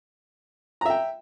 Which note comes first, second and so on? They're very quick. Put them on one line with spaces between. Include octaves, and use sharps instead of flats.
A#5 E5 G5